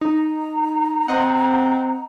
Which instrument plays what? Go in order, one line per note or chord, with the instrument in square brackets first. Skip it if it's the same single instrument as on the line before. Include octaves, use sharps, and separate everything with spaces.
[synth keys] D#4 [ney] A#5
[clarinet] C4 [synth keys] C5 D#5 F#5